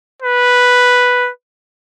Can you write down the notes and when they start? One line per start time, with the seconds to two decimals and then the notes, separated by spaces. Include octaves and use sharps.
0.22 B4